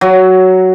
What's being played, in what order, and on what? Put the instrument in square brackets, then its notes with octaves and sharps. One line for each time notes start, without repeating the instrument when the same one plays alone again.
[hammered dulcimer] F#3